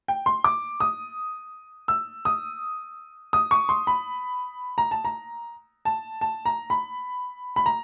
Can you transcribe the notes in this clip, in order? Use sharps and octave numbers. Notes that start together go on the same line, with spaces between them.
G5
C6
D6
D#6
E6
D#6
D#6
C#6
C6
B5
A#5
A5
A#5
A5
A5
A#5
B5
B5
A#5